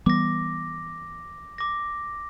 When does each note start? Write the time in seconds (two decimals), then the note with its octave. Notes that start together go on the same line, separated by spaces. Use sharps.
0.06 E3 G3 B3 D6 A#6
1.58 D6 A#6